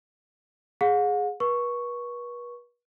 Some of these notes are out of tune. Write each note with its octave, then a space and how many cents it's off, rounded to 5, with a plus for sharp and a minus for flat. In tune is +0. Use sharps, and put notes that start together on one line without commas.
G#4 +0 F#5 -45
B4 -40 C#6 +0